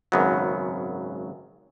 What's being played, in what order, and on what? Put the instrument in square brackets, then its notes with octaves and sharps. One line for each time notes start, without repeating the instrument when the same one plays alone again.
[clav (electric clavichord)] G#1 F#2 C#3 F#3 B3